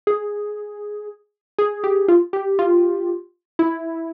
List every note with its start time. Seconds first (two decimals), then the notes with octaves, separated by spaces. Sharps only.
0.07 G#4
1.58 G#4
1.84 G4
2.08 F4
2.33 G4
2.59 F4
3.59 E4